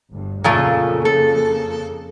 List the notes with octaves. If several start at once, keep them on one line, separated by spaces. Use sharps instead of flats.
G1 D2 G2
F2 A#2 C#3 F3 A3 A#3
A4